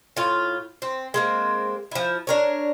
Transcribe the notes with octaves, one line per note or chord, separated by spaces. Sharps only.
A2 F4
C4
G#3 A#3 C4
F3 E4
D4 A#4 C#5